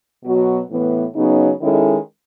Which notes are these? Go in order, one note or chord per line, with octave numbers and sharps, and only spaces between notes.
B2 F#3 B3 F#4
A2 E3 B3
C#3 F#3 B3 D#4
D#3 G#3 C#4 E4 A4